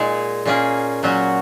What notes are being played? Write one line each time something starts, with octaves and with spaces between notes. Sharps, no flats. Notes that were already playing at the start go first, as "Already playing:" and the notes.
Already playing: A#2 G#3 D#4 G#4
A#2 A#3 C#4 G#4
A#2 F#3 C#4 F#4